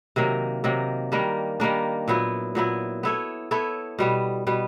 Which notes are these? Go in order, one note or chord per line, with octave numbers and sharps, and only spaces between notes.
C3 D#3 F#3 A#3
C3 D#3 F#3 A#3
D#3 G3 A#3 D4
D#3 G3 A#3 D4
A#2 F#3 B3 E4
A#2 F#3 B3 E4
B3 E4 A4 C#5
B3 E4 A4 C#5
B2 G3 B3
B2 G3 B3